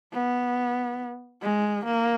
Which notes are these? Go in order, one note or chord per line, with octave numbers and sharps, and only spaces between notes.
B3
G#3
A#3